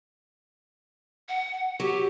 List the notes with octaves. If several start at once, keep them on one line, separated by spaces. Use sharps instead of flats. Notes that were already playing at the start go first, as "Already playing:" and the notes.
F#5
F#3 G4